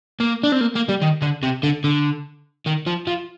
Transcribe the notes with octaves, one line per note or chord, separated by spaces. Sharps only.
A#3
D4
C4
A#3
A#3
G3
D#3
D3
C3
D3
D3
D#3
F3
F3